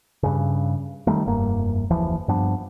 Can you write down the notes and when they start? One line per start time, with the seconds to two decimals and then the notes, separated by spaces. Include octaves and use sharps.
0.23 G2 C#3
1.07 D#3 F#3 G3 A3
1.26 F1 G2 A#3
1.90 F#1 D#2 E3 F3
2.28 G2 F3 B3 D4